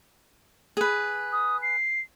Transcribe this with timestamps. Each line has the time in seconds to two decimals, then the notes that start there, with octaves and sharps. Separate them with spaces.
0.77 G#4 B4
1.32 D#6
1.62 C7